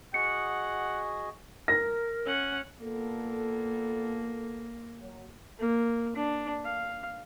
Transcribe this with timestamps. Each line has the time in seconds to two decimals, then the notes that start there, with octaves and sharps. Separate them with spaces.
0.14 F#4 G#4 D#5 F#5 C#7
1.68 A#4 A#6
2.26 C#4 F#5
2.81 A#2 A#3 B3 A4
5.00 F#3
5.60 A#3
6.16 D4
6.65 F5